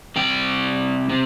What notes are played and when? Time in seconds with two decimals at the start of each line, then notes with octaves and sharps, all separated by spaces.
0.16 C3 G3 G5
1.10 C3